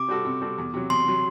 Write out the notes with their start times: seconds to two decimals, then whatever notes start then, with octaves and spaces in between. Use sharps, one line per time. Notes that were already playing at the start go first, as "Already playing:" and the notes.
Already playing: C3 D6
0.08 G3 C4 F#4 A4
0.25 C3
0.41 G3 C4 F#4 A4
0.58 E2
0.74 C3 F#3
0.90 E2 C6
1.07 C3 F#3